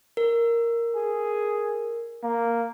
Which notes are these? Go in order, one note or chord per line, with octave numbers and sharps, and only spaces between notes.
A#4
G#4
A#3